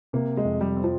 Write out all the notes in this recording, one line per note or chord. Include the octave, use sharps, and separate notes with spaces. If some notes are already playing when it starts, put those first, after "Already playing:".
C3 A#3
G#3
F2
G3
C4
F3